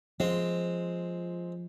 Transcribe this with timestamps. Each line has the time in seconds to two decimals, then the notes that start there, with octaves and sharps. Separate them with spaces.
0.20 F3 G#3 C4